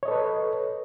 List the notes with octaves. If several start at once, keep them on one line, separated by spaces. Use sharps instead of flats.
A4 B4 C#5 D#5